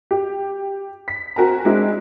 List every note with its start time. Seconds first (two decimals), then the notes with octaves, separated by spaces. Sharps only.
0.11 G4
1.08 B6
1.36 C4 F#4 A#4 G#5 A#5
1.65 G#3 C4 D4 E4 G#4